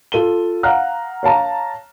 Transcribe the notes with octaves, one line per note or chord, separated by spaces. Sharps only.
F4 A4 D#7 G7
F5 F#5 A#5 F6 F#6
C#5 F5 A5 A#5